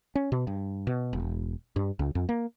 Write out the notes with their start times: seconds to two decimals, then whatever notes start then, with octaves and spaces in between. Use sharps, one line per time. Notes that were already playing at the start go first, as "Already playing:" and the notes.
0.15 C#4
0.32 B2
0.47 G2
0.87 B2
1.13 E1
1.76 G2
1.99 C#2
2.15 F2
2.29 A#3